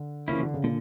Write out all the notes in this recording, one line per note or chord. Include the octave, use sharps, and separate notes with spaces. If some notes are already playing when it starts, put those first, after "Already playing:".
Already playing: D3
C#3 E3 F3 A#3 C#4 E4
D3
C#3
A#2 D3